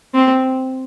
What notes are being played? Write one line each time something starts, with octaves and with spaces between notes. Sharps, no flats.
C4